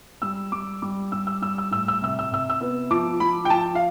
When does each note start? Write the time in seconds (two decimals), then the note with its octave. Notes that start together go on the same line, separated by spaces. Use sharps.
0.22 G3 E6
0.52 G3 D6
0.82 G3 D6
1.12 G3 E6
1.27 E6
1.42 G3 E6
1.58 E6
1.71 A2 E6
1.88 E6
2.02 C3 E6
2.19 E6
2.31 C3 E6
2.50 E6
2.61 B3
2.91 F3 D6
3.20 F3 B5
3.45 G5
3.50 F3 A5
3.75 F5